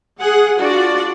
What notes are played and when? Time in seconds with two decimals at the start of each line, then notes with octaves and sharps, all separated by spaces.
0.20 G#4 F#5
0.58 D4 F4 F#4 D5